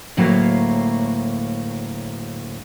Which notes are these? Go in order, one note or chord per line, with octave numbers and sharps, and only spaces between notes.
D2 A2 F#3 A3 A#3 F5